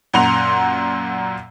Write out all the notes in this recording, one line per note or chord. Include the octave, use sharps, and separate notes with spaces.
F#2 A#2 F#5 A#5 C6 F7